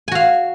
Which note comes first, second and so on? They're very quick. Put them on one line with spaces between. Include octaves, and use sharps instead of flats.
G#5 F#4 F5